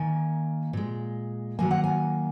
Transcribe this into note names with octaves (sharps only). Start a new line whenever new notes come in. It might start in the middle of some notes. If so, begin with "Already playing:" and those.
Already playing: D#3 A#3 G#5
A#2 G#3
D#3 F#3 A#3 G#5
F#5
G#5